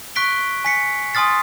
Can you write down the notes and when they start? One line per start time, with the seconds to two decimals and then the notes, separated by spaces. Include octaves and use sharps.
0.15 C#6 F#6 B6 D7 G7
0.65 G#5 B6 C#7
1.14 G#5 C6 D#6 F6 A6 C7